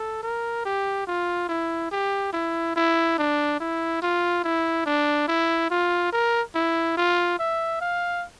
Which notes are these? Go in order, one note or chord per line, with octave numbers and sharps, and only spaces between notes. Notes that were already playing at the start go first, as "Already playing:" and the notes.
Already playing: A4
A#4
G4
F4
E4
G4
E4
E4
D4
E4
F4
E4
D4
E4
F4
A#4
E4
F4
E5
F5